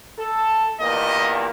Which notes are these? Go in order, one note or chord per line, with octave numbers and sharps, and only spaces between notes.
A4
E2 G2 A#2 D#5